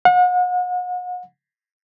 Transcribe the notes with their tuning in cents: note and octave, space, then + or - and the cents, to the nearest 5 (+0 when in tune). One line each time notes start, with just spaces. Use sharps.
F#5 -40